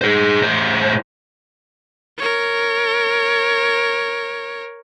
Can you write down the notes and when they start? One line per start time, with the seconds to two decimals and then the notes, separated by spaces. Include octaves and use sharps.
0.02 G#4 C5
0.42 A2 C5
2.18 A#4 C#5